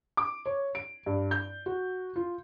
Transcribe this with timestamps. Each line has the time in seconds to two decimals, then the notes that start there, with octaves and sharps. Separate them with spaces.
0.17 D6
0.46 C#5
0.75 D7
1.06 G2
1.31 G6
1.66 F#4
2.16 F4